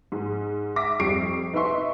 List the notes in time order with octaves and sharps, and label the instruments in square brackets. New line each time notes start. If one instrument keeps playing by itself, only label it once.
[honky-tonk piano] G#2
E5 D6 A#6 B6
F2 G3 C#6 C7 D7
D#4 B4 D#5 E5 C6 C#6